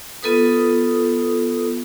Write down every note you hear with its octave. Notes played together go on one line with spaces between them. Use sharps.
B3 F4 A4 B4 D#6